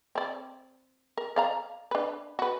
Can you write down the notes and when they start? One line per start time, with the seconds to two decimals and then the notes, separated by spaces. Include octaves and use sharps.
0.15 C4 D5
1.17 A#4
1.36 D5 F5 A#5
1.91 D4 B4
2.39 F#4 B4